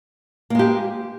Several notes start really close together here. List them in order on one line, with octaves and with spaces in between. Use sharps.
A#3 G#3 G4